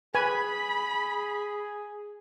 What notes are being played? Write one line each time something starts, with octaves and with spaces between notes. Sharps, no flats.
G#4 B4 G#5 B5